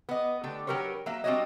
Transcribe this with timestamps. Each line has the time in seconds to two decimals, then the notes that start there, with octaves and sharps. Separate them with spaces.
0.09 B3 D#5
0.44 D3 A3 G4
0.67 F#3 G4 A#4 B4 C#5
1.06 F#3 A#3 E5
1.24 G3 C4 D4 F#4 C#5 D#5